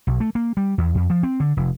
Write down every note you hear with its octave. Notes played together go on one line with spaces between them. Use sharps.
B1
A3
A#3
G3
E2
F2
F3
C4
D3
F1